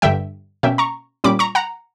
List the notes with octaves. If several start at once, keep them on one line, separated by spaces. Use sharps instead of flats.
G2 D3 G3 E5 G5
B2 A#3 C#4 E5 G5
A#5 C#6
A#2 G3 C#4 B5 D6
A#5 C#6
F#5 A#5